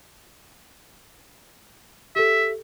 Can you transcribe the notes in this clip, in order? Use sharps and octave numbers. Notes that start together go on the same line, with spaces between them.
G4 A4 E5